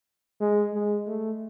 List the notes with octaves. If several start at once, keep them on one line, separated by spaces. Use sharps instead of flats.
G#3
G#3
A3